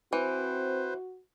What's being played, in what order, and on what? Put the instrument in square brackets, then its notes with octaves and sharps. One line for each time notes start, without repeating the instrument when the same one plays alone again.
[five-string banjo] E3 [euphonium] C4 [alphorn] F#4 [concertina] B4 C5